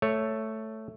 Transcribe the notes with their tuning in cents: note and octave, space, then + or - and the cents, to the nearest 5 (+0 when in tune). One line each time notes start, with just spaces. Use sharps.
A3 +0 C#5 +0